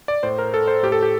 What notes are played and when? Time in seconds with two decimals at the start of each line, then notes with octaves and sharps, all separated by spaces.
0.08 D5
0.23 A2 C5
0.39 A#4
0.54 A4
0.68 C5
0.83 A2 G4
0.92 A4
1.03 G4